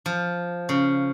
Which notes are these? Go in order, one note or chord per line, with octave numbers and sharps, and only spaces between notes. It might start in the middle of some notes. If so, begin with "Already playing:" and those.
F3
C#3